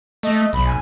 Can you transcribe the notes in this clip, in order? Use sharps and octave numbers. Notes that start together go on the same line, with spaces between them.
A3 D#5
B1 B5
G#5